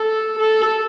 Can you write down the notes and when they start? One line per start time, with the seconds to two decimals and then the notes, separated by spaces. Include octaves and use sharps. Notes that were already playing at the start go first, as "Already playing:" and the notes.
Already playing: A4
0.39 A4